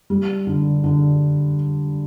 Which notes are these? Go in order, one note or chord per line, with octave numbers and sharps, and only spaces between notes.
G3
D3
D3